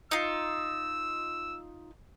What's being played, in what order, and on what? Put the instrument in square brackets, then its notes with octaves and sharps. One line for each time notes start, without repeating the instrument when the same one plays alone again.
[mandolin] D#4 F4 [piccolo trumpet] E6